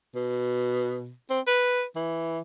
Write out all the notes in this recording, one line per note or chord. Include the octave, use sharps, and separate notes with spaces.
B2
C4
B4
E3